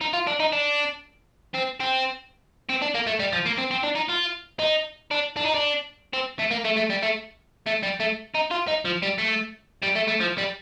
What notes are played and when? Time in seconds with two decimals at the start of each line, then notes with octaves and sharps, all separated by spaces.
0.01 D#4
0.14 F4
0.27 D4
0.40 D#4
0.52 D4
1.54 C4
1.80 C4
2.69 C4
2.82 D4
2.95 A#3
3.07 A3
3.20 G3
3.33 F3
3.46 A#3
3.58 C4
3.71 C4
3.84 D4
3.96 D#4
4.10 F4
4.59 D#4
5.11 D4
5.36 D4
5.45 D#4
5.54 D4
6.13 C4
6.39 A3
6.51 A#3
6.64 A3
6.76 A3
6.90 G3
7.03 A3
7.66 A3
7.83 G3
8.00 A3
8.34 D#4
8.51 F4
8.68 D#4
8.85 F3
9.02 G3
9.18 A3
9.83 G3
9.96 A3
10.08 A3
10.21 F3
10.38 G3